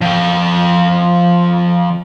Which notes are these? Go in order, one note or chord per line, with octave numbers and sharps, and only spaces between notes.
F3 G5